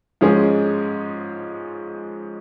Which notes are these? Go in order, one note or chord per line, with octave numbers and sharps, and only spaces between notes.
G#2 F3 G#3 C#4 G#4